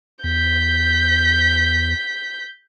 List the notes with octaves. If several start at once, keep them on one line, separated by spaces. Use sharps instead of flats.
E2 G6 B6